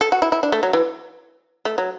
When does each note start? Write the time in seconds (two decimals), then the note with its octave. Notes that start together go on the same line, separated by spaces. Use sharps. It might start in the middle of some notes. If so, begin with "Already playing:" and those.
0.01 A4
0.12 F#4
0.22 E4
0.32 E4
0.43 D4
0.52 A3
0.63 F#3
0.73 E3
1.65 A3
1.78 F#3